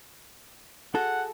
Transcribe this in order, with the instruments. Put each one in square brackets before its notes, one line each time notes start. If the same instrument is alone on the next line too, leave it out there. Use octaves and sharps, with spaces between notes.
[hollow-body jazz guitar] F#4 G#4 A4 [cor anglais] F#5